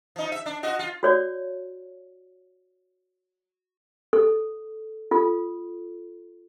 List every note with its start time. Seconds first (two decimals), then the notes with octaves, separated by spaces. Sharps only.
0.16 F3 D#4
0.32 E5
0.46 D4
0.63 F4 F#4 D#5
0.79 F4
1.03 F#4 C#5 D5
4.13 A4
5.11 F4 A4